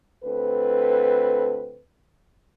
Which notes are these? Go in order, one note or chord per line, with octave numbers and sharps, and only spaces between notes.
D2 C4 A4 B4